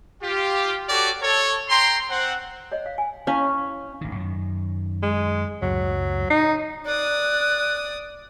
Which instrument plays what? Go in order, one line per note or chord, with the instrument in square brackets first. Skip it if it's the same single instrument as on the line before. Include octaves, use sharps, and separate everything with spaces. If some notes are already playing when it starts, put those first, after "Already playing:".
[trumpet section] F4 G4
F#4 G4 A4 C#5 D5
A4 C#5
G5 A#5 C6
C4 F#5
[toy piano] C#5 D#5
F5
G#5
[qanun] C#4 [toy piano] E4 C#5 F5
[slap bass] A1 D#3
F#2 D#3
[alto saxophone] G#3
[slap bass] C#2 F#2 A2 [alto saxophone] F#3
[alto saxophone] D#4
[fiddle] D5 D#6 [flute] F#6